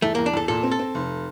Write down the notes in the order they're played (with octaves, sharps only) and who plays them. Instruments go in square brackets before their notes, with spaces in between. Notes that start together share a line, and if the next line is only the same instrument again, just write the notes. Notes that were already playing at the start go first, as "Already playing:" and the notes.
[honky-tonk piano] E2 [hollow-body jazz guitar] A3
[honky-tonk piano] E2 [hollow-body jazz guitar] A#3
[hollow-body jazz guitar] D4
[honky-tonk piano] E2 [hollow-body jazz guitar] A4
[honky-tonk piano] A#2 [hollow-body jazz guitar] A4
[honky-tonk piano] C4
[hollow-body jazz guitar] A4
[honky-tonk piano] C4
F1